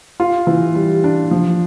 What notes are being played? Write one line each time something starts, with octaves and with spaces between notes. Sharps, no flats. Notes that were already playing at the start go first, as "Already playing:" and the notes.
F4
E3
G3
D4
F3